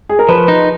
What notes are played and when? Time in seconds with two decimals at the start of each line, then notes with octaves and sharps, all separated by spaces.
0.09 G#4
0.19 A#4
0.29 F3 B4
0.48 D#4